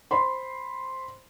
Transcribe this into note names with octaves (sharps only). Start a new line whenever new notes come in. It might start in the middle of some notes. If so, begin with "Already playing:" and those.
C5 B5 C6